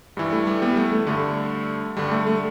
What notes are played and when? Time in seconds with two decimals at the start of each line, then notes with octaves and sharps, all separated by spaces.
0.17 G2 E3 G3
0.32 A3
0.47 G3
0.62 G3 B3
0.77 A3
0.92 A3
1.06 G2 D3 A3
1.97 G2 D3 G3
2.11 A3
2.27 A3